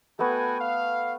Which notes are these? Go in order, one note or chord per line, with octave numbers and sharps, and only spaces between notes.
A3 B3 F#4 G5 G#5
F5